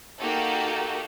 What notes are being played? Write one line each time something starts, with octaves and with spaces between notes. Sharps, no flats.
A#3 D#4 F#4 G4 A4